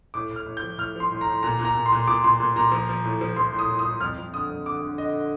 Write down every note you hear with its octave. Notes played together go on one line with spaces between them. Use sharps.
A2 D6
A2
F6
A2
G6
F3
A2 F6
F3 C6
A2
A#5
A2
A#2 A#5
A#2
A#5
A#2
C6
A#2
A#2 D6
A#2 C6
A#2
A#2 A#5
F3
F3
A2
F3
F3 C6
A2
D#6
A2
D#6
A2
F2 F6
F2
D3 D#6
F2
D3 D6
D3
D3 D#5
D3